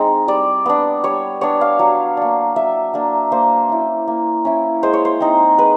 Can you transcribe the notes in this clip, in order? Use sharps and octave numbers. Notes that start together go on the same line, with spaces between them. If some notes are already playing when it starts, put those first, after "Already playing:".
Already playing: G#3 C4 D#4
G3 D5
B3 D4
G3 C#5
B3 D4 C#5
F5
F#3
A#3 D4
F#3 E5
A#3 D4
A#3 C5
C#4 E4
A#3
C#4 E4
G#3 C5
C#5
C5
C4 D#4
G#3 B4